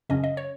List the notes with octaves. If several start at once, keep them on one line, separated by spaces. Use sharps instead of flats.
F#2 C#3 F#3 C#4 D#5
D#5
C#5